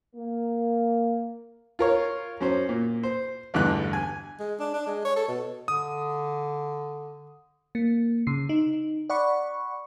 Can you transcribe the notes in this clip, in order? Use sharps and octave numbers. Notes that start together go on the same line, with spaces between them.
A#3
F4 A#4 C#5
F#2 C#4 C5
A#2
C5
A1 E2 G2 D3 F#6
G#5
G#3
D4
D4
G#3
C#5
A4
B2
D3 D#6
A#3
C#3 C7
D#4
D5 F#5 B5 C#6